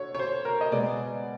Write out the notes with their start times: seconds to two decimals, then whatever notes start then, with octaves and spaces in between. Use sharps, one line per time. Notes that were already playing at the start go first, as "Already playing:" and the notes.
Already playing: D3 C#5
0.15 C#5
0.19 C5
0.45 A#4
0.61 D#5
0.72 B2 G#3 B3 D5